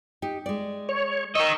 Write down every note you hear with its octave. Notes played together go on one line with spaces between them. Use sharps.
D#4 G4
G#3 D5
C#5
A#4 D#5 C#6 E6